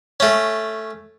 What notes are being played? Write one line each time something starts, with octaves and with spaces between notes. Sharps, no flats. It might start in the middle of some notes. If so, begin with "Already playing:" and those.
A3 C#4